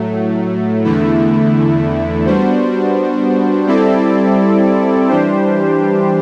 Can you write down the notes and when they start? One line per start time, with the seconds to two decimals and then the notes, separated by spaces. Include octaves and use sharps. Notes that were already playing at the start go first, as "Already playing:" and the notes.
Already playing: A2 F#3 A3
0.84 E2 D3 A3 E4
2.26 G3 B3 D4 F#4 C5
3.67 G3 C4 E4 A4 D5
5.09 E3 G3 D4 G4 C5